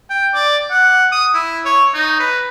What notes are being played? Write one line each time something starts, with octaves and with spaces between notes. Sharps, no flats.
G5
D5
F#5
D#6
E4
C#5
D#4
B4